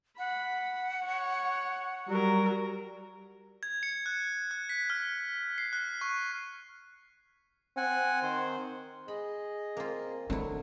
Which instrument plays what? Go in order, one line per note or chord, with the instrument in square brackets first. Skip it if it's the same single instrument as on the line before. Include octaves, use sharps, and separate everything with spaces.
[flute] F#5 [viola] B5
[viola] C#5
[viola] F#3 A#4 [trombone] G3
[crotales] G#6
C#7
F#6
F#6
B6
F6
C7
F#6
C#6
[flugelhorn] C4 [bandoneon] F#5 G#5
[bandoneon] D#3 C5
[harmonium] G#4 D#5 [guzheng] B5
[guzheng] A#3 F4 [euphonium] C4
[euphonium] D3 [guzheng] F#3 E4 [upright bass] C4